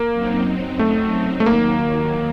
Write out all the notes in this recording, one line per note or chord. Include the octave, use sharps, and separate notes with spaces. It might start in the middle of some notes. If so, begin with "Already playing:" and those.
Already playing: A#3
F#2 F#3 C4 D#4
F#2 F#3 A3 C4 D#4
A3
D#2 D#3 F#3 A#3